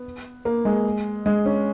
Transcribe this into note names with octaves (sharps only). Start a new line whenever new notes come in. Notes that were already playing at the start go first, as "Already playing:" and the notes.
Already playing: B3
A#3
G#3
G#3
C#4